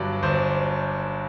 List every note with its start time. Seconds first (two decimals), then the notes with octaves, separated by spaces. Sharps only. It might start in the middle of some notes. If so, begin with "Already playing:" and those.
Already playing: G1 G2 F#3 D5
0.23 G1 C5